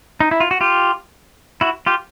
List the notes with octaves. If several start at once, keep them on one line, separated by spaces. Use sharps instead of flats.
D#4
E4
F4
F#4
F4 G4
E4 F#4
F4 G4